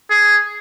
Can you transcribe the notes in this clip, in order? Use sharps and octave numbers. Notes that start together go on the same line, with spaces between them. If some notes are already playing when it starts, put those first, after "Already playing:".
G#4